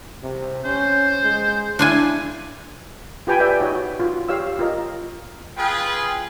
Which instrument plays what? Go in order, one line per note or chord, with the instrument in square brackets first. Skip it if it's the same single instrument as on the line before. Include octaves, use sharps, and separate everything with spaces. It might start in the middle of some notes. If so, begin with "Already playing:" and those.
[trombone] C3
[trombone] C#4 [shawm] C5
[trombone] G#3
[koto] D4 F4 G#5 [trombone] E4
[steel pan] F4 G4 B4 G5 G#5 B5
B4 D5 E5 G5
D#4 F#4 C#5
F4 F#4
G4 C#5 F5 E6
F4 A#4 D#5
[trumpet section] F4 G#4 B4 G5